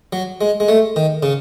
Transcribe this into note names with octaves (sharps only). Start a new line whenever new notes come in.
F#3
G#3
G#3
A3
D#3
C#3